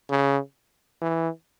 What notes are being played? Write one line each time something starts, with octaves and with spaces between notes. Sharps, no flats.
C#3
E3